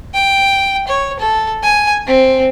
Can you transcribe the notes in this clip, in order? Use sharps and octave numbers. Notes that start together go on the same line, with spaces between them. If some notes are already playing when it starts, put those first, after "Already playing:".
G5
C#5
A4
G#5
C4